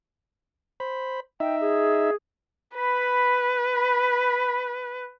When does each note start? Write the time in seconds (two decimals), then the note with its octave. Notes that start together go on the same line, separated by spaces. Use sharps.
0.80 C5 B5
1.40 D#4 E5 G5
1.60 G#4
2.78 B4 B5
3.76 B5